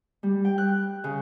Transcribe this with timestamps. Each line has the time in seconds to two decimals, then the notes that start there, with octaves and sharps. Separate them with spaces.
0.23 G3
0.45 G5
0.58 F#6
1.04 C#3